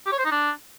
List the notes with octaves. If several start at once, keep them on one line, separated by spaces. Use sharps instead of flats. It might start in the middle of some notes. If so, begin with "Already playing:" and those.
G4
C#5
C5
D#4
D4